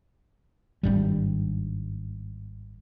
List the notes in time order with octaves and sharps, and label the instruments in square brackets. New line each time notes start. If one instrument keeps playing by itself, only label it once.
[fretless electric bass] G#1 G2 G3